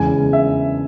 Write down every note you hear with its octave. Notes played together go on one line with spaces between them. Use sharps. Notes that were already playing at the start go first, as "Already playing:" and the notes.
Already playing: E2 C#3 E3 G#3 G#5
E5